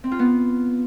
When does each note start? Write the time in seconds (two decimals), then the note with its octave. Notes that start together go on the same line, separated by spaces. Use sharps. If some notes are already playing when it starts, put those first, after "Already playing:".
0.04 C4
0.11 F4
0.19 B3